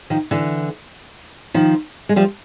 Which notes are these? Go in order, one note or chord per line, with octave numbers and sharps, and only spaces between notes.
D#3 F3
D3 E3
D#3 F3
G#3
F3 G3